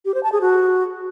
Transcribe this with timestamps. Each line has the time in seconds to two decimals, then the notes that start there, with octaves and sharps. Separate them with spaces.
0.05 G4
0.14 C5
0.23 A5
0.32 G#4
0.41 F#4